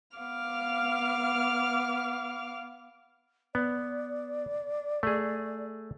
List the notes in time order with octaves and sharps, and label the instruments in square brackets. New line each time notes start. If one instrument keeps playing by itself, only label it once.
[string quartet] B3 F5 D6 F6
[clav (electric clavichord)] B3 [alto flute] D5
[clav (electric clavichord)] A3 G#4